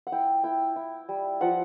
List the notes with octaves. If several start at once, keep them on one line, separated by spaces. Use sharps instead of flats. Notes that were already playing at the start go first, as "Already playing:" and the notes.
F#5
E4 G5
E4 G5
E4
G3
F3 F#5